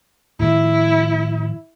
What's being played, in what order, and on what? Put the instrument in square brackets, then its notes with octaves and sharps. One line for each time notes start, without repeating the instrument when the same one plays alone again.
[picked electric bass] A2 D#3 F3 [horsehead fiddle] E4